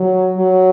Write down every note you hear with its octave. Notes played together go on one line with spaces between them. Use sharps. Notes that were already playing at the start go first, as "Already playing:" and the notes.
Already playing: F#3
F#3